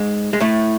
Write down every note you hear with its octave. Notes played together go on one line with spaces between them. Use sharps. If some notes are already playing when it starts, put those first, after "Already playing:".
Already playing: G#2 G#3
G#3
A2 A3